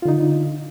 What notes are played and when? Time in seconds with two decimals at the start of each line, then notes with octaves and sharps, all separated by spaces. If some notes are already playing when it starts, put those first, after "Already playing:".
0.02 F4
0.05 D3
0.08 D#4